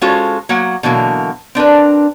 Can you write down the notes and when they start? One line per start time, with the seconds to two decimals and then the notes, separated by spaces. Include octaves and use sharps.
0.01 G#3 C#4 F4 F#4 A4 C5
0.49 F#3 A#3 F#5
0.83 B2 D3 E3 F#3 A#3
1.55 C4 D4 A#4 B4